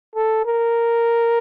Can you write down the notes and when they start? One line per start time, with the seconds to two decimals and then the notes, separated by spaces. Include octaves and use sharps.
0.15 A4
0.45 A#4